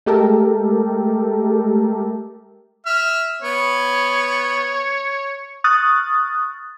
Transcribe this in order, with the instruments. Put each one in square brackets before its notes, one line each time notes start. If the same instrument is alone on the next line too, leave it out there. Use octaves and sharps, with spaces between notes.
[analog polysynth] G#3 A3 G4 A4 A#4
[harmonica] E5 F6
[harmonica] B3 [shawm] C#5
[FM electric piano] C#6 D#6 F6 F#6 A6